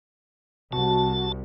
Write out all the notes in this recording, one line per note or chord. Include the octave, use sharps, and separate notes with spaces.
C2 F#4 A5